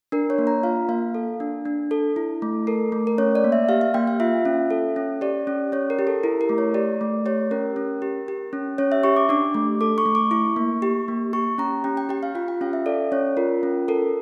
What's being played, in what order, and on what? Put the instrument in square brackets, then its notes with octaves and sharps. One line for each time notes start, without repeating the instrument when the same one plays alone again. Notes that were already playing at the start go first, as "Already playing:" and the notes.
[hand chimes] D4 A#4
C#5
A#3
A#5
F4 F5
A#3 F5
A4
D4
D4
A4
E4
A3
A4 A#4
A3
A#4
C#4 C#5
D5
A#3
E5
G4 F5
F5
A#3 G5
F5
F4 E5
C#4
A4
C#4
G4 D5
C#4
C#4 C#5
A#4
G4
A4
E4 A#4
A#4
A3
C#5
G4 D5
A3
G4 C#5
C#4 A#4
C#4
G4
G4
C#4
C#4 C#5
E5
G4 C#6
D6
D4 D6
A3
A4 D6
C#6
A3
D6
E4 C#6
A#3
G4
A#3
G4 C#6
C#4 A#5
C#4 G5
G5
G4 G5
F5
F4 G5
G5
C#4 F5
E5
A4 D5
C#4 C#5
F4 A#4
C#4
A4 A#4